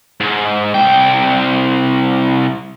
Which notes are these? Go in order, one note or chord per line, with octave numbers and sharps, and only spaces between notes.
G#2
C2 G5